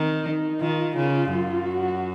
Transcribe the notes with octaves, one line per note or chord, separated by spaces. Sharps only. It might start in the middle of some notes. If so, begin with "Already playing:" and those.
Already playing: D#3 C4
D#4
D#3 F4
C#3 F4
F#2
F#4